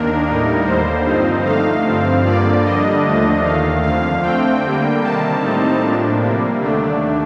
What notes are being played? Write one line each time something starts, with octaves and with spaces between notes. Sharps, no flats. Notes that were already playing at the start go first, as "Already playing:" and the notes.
Already playing: D#2 D#3 A#3 D4 A#4
A2 G3 A#3 D#4
D#2 D3 G3 A#3 C5
G2 F3 C4 D#4
D3 A3 D#4 F5
G2 F3 C4
G2 D3 F3 A#3 D5
D3 G3 D4 D#5
D#2 D3 F3 A3 D4
D#2 D#3 A3 F5
F2 D3 F3 F5
D3 A3 C4 G5
D3 G3 A#3
C3 D#3 G3 A#3 A5
A2 G3 C4 D#4
A2 F3 A#3 D4
C3 G3 A#3
D#2 D3 A3 D4